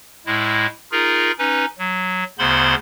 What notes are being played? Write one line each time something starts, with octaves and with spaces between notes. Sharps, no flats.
A2 G#3 E4
D#4 F4 G#4 A#4
C#4 D#4 B4
F#3
D2 C#3 B3 C5 B5 C6